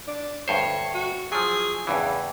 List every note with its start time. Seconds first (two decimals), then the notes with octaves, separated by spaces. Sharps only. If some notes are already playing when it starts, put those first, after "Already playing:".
0.08 D4
0.48 D2 G2 C5 C#5
0.94 F#4
1.32 F3 F#3 G#4
1.87 E2 G2 C#3 E3